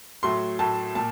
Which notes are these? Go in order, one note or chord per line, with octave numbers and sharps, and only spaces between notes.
A2 F#3 A3 C6
A2 F#3 A3 A5
A#2 A5